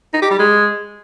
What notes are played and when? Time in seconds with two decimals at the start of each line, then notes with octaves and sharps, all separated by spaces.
0.14 D#4
0.22 G4
0.31 G3
0.40 G#3